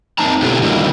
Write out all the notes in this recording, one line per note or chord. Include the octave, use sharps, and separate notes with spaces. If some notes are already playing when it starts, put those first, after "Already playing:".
A#3 C4 D#4 A5 A#5
B2 D3 B3 E4 G4 A4
D3 D#3 F#3 G3 A#3 E4